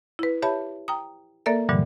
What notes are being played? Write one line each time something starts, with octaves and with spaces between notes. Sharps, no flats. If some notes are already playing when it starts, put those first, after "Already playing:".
E4 B4
G4 C#5 E5 A5 B5
G5 A#5 D#6
A#3 A4 A#4 D5 E5
G2 A#2 D3 E3 F#3 G3